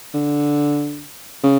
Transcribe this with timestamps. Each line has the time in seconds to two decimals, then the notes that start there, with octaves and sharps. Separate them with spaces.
0.14 D3
1.44 C#3